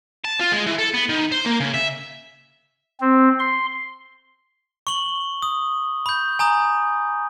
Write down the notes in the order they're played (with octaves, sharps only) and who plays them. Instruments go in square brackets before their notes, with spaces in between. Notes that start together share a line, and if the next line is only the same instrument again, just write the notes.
[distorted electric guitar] A5
F4
G#3
E3
A4
B3
D#3
C5
A#3
C#3
E5
[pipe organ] C4
C6
[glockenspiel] C#6 F#7 G7
D#6
B5 G6
G#5 A#5 D#6